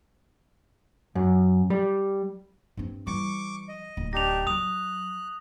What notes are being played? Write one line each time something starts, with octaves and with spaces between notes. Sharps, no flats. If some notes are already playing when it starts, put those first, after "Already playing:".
F#2
G3
G2 C4
E3 G3 C#6 D6
D#5
D1
D4 D#4 G4 A#6 F7
F#3 D#6 F#6 F7